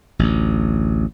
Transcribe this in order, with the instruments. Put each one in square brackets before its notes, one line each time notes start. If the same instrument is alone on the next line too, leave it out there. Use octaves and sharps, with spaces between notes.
[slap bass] A1 D2